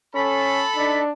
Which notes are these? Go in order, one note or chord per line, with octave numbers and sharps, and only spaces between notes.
C#4 A4 B5
D4 D#4